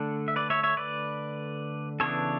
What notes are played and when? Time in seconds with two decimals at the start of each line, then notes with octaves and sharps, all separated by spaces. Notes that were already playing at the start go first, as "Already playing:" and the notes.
Already playing: D3 A3 D4
0.28 E5
0.36 B4 D5
0.50 C#5 E5
0.63 C#5 E5
0.77 B4 D5
2.00 C#3 E3 B3 D4 A4 C#5